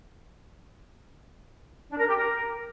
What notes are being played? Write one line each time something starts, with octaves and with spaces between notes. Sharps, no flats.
D4
A#4
G4
A#4